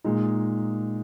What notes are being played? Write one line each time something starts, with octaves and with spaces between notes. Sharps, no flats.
A#2 G#3 D#4